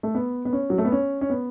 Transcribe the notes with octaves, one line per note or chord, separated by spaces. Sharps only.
A3
B3
B3
C#4
F#3
A3
B3
C#4
C#4
B3